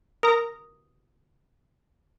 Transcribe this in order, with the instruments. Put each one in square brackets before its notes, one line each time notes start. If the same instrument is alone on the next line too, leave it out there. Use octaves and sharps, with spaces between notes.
[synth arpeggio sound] A#4 A#5 [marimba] D#6